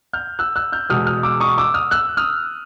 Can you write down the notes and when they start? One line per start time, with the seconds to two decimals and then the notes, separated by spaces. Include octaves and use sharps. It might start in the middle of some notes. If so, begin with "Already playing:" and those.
0.13 F6 G6
0.39 E6 F#6
0.56 E6 F#6
0.72 F6 G6
0.89 E2 B2 G#3 D#6 F6
1.06 D#6 F6
1.23 D6 E6
1.40 C#6 D#6
1.58 D6 E6
1.74 D#6 F6
1.91 E6 F#6
2.17 D#6 F6